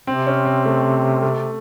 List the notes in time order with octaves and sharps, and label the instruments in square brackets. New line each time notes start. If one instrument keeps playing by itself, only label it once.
[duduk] C3 [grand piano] C4
[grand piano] C#4
C4
A3
A3